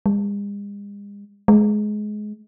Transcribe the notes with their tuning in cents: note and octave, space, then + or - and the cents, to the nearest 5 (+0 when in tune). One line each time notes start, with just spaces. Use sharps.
G#3 -45
G#3 +20